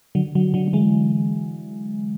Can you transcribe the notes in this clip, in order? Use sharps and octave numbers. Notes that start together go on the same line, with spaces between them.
D3 F#3
D3 F#3
D3 F#3
F#3
E3 G#3